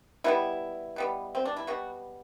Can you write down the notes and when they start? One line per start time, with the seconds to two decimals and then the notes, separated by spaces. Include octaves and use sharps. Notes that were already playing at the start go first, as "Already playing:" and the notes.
0.24 B2 G3 B3 E4
0.96 B2 G3 B3
1.35 C4
1.45 D4
1.57 E4
1.67 B2 G3 B3 F#4